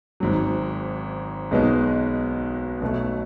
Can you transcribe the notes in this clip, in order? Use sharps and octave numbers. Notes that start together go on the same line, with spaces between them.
G#1 G#2 F#3
B1 B2 G#3 B3 D#4
B1 B2 A3